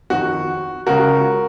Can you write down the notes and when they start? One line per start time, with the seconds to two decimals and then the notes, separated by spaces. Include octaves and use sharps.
0.10 F2 D#3 F#4
0.86 C#2 C#3 F#4 A#4